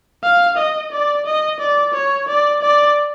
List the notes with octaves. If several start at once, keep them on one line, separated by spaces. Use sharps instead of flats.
F5
D#5
D5
D#5
D5
C#5
D5
D5